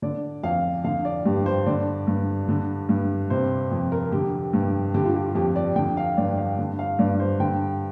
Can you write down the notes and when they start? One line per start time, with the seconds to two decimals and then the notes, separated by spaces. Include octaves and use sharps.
0.02 D3 D5
0.43 F2 F5
0.84 D3 F5
1.05 D5
1.25 G2 G4
1.46 C5
1.66 D3 D5
2.07 G2
2.49 D3
2.89 G2
3.30 C3 C5
3.71 F2
3.92 A#4
4.12 D3 G4
4.53 G2
4.94 D3 G4
5.05 F4
5.15 G4
5.35 F2 G4
5.56 D5
5.76 D3 G5
5.97 F5
6.17 G2 D5
6.37 F5
6.59 D3
6.79 F5
6.99 G2 D5
7.20 C5
7.40 D3 G5